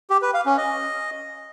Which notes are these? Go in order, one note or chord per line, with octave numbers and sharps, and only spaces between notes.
G4
B4
F5
C#4
D#5